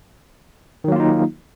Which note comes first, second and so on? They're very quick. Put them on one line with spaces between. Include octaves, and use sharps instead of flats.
D#3 F#3 A#3 F4 D#4